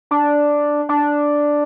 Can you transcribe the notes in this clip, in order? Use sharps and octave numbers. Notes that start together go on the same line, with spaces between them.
D4
D4